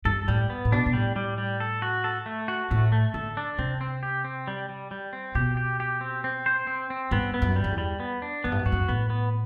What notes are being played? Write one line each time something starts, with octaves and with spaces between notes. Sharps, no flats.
G2 A4
A2 G3
B3
A2
B2 D4
B2
A2 G3
G3
G3
A4
F#4
A4
A3
F#4
A2 A3
A3
D3 A4
D4
C3 C4
C4
G4
C4
G3
G3
G3
C4
B2 G4
G4
G4
C4
C4
C5
C4
C4
G2 B3
B3
F#2
G3
F#2
E2
G3
B3
D4
F#2 B3
G2
F#2
G2 F#4
F#2
A2 B3
B3